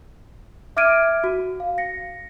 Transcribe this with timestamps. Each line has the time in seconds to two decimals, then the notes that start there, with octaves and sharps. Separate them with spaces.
0.77 E5 D6 F6 G#6 D7 D#7
1.24 F#4
1.60 F5
1.78 A#6 C#7